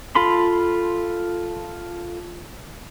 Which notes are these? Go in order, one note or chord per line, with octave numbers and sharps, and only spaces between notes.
F4 A4 B5 C6